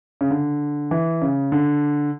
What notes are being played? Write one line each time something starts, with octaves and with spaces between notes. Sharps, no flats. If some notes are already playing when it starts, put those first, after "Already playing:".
C#3
D3
E3
C#3
D3